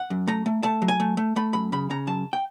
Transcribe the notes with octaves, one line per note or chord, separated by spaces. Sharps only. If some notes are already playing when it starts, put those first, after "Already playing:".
Already playing: F#5
F#2
A3 A#5
A3
A3 A5
F#3
G#5
A3
A3
A3 B5
F#2 B5
C#3 B5
C#3 A#5
F#2 A5
G5